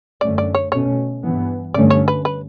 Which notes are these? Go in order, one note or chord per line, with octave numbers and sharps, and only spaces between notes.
F#2 D3 A3 C#4 D5
D5
C#5
B2 A3 C#4 C#5
G2 E3 B3
G2 D3 A3 C#4 D5
C#5
B4
B4